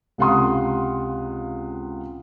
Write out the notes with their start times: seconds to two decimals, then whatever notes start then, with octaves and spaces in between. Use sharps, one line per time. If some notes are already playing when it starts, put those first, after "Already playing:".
0.18 C#2 C3 F5 F#5 C6 D#6